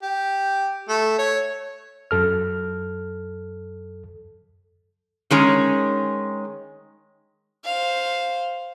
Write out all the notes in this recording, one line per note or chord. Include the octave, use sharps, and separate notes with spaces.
G4
A3
C#5
F#2 A4 F6
D#3 G#3 C#4
C5 F5